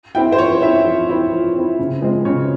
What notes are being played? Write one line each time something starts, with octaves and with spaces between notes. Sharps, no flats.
C4 E4 G5
C5
F3 C#5
C4 E4 E5
F3
C4 E4
F3
C4 E4
C#3
F3 G#3 C4
C#3 C#5